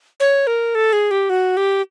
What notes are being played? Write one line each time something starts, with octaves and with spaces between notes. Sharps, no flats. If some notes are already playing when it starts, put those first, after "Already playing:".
C#5
A#4
A4
G#4
G4
F#4
G4